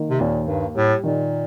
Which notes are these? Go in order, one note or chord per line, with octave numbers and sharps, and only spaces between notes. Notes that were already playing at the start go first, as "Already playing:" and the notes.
Already playing: D#3 A#3
C3
D#2 A#2
G2 A#3
A2 G3
A#2 D#3